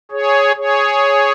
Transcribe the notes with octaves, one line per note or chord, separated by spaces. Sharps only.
G#4 C#5
G#4 C#5